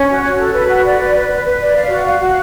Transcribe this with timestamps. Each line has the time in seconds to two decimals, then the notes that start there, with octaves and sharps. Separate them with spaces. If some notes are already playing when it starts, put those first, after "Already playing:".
Already playing: C#4
0.09 F#4
0.24 F#4
0.38 A4
0.53 B4
0.69 F#4
0.84 D5
0.99 B4
1.14 B4
1.29 B4
1.45 B4
1.60 D5
1.75 F5
1.90 F#4
2.05 F5
2.20 F#4